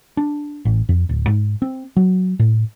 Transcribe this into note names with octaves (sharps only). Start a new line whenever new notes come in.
D4
A1
F2
D1
G#2
C4
F#3
A2